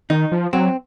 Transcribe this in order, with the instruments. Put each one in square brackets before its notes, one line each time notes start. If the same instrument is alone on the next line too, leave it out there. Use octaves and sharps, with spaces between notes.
[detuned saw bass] D#3 [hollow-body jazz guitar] D#4
[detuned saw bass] F3
[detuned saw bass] F#3 [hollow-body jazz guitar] C4